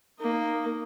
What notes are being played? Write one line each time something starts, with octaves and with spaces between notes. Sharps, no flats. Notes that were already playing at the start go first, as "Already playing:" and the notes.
A#3 D#4